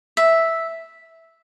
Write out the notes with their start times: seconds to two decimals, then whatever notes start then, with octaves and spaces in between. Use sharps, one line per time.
0.17 E5